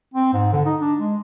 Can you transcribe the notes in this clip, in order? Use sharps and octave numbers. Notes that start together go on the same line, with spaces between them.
C4
G#2
D3
D#4
D4
G#3